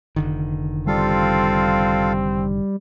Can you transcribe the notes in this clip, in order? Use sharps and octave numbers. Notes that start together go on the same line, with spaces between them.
F1 D3 D#3
G3 C4 F4 A4 F5